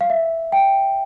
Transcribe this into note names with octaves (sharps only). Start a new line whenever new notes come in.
F5
E5
G5